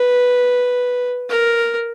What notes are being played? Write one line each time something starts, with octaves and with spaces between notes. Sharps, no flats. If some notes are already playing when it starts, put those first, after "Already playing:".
Already playing: B4
A#4